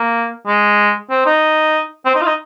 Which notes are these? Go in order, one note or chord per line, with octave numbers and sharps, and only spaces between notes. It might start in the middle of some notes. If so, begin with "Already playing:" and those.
Already playing: A#3
G#3
C4
D#4
C4
D#4
F4
D#4